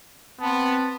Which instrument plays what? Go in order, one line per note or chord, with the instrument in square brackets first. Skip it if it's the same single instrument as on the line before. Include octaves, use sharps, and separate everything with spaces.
[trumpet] B3 [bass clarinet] C4 [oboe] A5